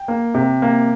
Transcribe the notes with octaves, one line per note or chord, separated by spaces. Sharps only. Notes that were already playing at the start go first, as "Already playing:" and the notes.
Already playing: G5
A#3
C3
A#3